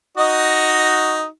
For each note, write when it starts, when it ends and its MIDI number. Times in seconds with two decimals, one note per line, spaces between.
0.18 1.25 63
0.18 1.25 66
0.18 1.25 75